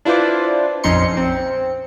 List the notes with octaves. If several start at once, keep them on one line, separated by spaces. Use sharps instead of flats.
D4 E4 F4 B4 C5 D5
A#1 F2 C#4 D#4 C6 C#7
C4